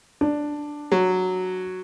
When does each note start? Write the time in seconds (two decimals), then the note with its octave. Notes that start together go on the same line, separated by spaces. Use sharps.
0.21 D4
0.92 F#3